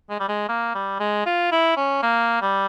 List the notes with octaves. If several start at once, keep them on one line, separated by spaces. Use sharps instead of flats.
G#3
G3
G#3
A#3
G3
G#3
F4
E4
C#4
A#3
G3